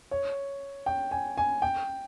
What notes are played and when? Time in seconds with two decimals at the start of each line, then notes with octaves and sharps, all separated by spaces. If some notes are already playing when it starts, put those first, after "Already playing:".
0.11 C#5
0.86 G5
1.11 G#5
1.38 G#5
1.62 G5